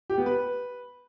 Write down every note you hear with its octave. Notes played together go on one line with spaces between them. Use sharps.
G4
B3
B4